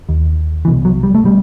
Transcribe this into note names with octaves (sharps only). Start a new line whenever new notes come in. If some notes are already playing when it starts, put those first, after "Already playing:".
D#2
C2 B2 E3
F#3
G3
A3
B2 G3